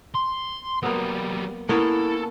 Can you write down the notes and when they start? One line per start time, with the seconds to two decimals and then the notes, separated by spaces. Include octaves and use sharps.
0.15 C6
0.83 F#3 G3 A#3 B3
1.69 A#3 B3 C#4 E4 A4